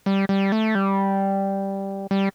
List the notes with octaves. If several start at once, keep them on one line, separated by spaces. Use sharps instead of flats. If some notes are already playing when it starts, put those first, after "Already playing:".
G3
G3
A3
G3
G3